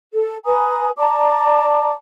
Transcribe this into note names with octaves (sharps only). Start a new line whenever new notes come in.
A4
B4 G#5 A#5 D#6
D5 A5 A#5 D6